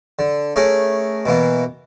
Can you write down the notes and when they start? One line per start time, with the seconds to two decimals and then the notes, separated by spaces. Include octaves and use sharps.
0.19 D3
0.56 A3 C#4 G#4 A#4
1.26 B2 E3 A#3 B3